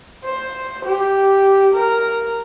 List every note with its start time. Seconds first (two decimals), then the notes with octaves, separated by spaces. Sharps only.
0.25 C5
0.85 G4
1.74 A#4